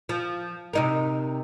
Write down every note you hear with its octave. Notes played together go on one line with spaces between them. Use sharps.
F3
C3 D#4 A#4